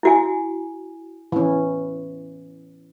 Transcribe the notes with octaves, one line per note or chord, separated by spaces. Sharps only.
E4 F#4 G#5
E3 C#4